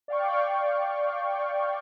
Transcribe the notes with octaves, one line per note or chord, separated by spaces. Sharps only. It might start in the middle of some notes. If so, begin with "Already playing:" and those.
D5 F5 G5 C#6